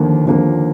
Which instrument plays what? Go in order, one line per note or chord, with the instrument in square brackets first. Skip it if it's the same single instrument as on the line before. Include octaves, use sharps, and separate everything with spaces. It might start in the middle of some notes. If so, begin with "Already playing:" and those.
Already playing: [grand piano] D#2 D3 F3 A#3
D#2 D3 F3 A#3